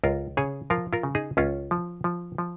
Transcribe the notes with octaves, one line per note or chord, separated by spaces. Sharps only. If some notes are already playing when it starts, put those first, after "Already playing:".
C#2 F4 A#4
C#3 G#4 C#5
F3 F4 A#4
F4 A#4
C#3
D#4 G#4
C#2 C#4 F4
F3
F3
F3